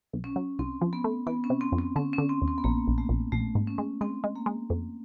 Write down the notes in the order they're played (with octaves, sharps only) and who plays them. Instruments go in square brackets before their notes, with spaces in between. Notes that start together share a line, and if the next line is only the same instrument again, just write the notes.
[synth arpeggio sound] B1
[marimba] C#4
[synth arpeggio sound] F#3
[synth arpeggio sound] C2 [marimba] C4
[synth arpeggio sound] F3
[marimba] B3
[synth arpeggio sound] A3
[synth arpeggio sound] E3 [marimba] B3
[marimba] C#4
[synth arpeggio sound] C3
[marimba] C4
[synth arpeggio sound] F2
[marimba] C4
[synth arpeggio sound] D3 [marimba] C#4
[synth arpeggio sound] D3 [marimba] C#4
[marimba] C4
[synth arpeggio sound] D#2
[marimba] C4
B3
[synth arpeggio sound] A#1 [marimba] A#3
[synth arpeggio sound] A#1
[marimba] A3
[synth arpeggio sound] A#1
[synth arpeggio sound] A#1 [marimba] A3
[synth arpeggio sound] G#2
[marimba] C#4
[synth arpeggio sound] G#3
[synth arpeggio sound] G#3 [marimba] C4
[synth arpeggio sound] G#3
[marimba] A#3
[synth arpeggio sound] G#3
F2